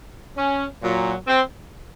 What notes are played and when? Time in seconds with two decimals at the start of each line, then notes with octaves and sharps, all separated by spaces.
0.37 C#4
0.82 A#2 F#3
1.27 C4